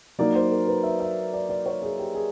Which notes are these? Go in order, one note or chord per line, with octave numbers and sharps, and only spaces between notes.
F#3 A#3 D#4 D5
C5
A#4
B4
E5
E5
D5
D5
C#5
G#4
G4
G#4